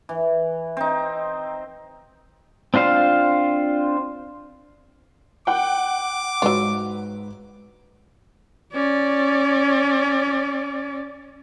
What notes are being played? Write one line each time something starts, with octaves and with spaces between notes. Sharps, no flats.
E3
C4 D#4
C4 D4 F4 C5 F5
F#5 G5 D6
G#2 F#3 F4 B4
C#4 D5